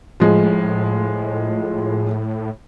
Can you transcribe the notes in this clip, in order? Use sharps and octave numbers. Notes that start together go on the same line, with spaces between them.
A2 F3 G#3